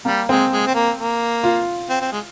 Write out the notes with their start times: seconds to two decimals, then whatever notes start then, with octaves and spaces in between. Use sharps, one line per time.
0.05 G3 A#3
0.29 G#3 C4
0.52 G#3
0.66 C4
0.75 A#3
0.98 A#3
1.43 F4
1.89 C4
2.01 C4
2.12 G#3